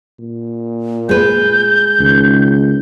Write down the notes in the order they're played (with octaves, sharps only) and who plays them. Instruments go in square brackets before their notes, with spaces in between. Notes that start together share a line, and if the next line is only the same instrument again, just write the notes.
[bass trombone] A#2
[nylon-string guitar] G#3 B4 [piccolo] G6
[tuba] C#2 [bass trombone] D#3